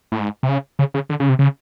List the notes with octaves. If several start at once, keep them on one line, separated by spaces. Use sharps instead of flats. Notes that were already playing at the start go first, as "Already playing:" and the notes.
A2
G#2
C3
C#3
C#3
C#3
D3
C#3
C3
C#3